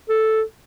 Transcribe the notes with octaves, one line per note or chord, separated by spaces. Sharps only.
A4